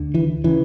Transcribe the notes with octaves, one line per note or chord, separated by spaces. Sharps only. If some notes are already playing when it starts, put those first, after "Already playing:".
Already playing: D2 D3
E3
C#3 E3